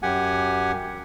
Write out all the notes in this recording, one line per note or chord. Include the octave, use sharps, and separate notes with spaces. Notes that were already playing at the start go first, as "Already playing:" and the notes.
F#2 G4 F#5 G#5